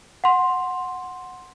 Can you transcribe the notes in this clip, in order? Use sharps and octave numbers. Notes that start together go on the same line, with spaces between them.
F#5 C6